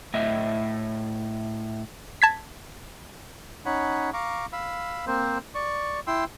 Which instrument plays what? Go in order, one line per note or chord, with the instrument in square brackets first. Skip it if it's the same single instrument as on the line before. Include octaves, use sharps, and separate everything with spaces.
[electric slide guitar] A2 D#5 E5
[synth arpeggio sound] A5 G#6 B6
[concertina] C#4 D#4 C#5 F#5 B5
F5 A#5 C#6 D6
F5 B5 E6
A#3 C4 C5
D5 C#6
E4 G5 C6 E6